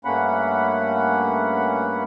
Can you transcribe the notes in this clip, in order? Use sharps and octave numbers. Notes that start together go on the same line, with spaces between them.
G2 A3 A#3 C#4 F#5 B5